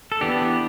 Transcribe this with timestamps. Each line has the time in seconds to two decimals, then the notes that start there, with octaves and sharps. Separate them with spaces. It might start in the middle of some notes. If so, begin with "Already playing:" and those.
0.12 A4
0.21 E3 B3 D4 G4